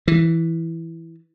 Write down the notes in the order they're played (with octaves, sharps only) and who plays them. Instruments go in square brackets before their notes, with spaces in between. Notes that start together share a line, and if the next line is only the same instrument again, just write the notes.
[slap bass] E3